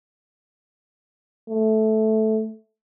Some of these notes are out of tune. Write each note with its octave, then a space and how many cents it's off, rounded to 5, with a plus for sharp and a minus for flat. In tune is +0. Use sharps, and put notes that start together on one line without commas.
A3 -10